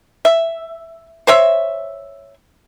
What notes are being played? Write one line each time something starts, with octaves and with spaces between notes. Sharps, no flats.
E5
C5 C#5 E5